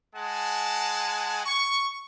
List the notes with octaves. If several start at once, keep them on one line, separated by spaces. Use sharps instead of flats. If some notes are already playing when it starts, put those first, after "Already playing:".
G#3 F#5 G#5 A5
C#6